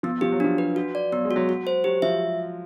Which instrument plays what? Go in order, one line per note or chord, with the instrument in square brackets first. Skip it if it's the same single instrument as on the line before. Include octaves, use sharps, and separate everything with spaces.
[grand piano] F3 [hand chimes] B3
[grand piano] F3 [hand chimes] G4
[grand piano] F#3
[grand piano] F3 [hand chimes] D4
[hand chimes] B4
F#4
D5
[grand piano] F#3 [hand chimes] B3
[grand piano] G#3
[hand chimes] F#4
[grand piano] F#3
[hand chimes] F#4
C5
[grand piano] F#3 [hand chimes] G4
[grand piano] F3 [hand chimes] E5